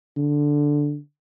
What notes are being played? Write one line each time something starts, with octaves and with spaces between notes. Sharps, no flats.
D3